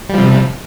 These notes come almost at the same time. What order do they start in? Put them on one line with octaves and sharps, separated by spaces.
G3 F3 C3